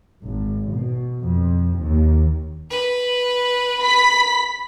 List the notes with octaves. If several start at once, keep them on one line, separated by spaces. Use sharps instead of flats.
G#1
B2
F2
D#2
B4
B5 B6